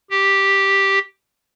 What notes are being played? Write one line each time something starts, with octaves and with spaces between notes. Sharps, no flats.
G4